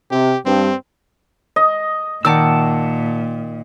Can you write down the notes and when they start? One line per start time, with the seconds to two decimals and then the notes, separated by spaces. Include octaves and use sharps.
0.11 C3 G4
0.46 G2 C4
1.56 D#5
2.25 A#2 D#3 D5 F#5 A5 D6 E6